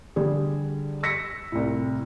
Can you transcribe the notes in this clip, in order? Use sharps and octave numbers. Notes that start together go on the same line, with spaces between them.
D3 G3 G#4
E6 A#6 B6 C#7
C2 A2